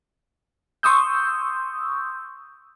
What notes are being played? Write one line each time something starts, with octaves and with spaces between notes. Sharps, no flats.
C6 C#6 D#6 E6 G6